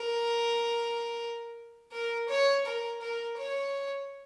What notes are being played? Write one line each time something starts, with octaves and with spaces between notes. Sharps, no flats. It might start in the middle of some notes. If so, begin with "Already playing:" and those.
Already playing: A#4
A#4
C#5
A#4
A#4
C#5